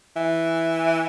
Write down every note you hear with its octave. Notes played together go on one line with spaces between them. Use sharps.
E3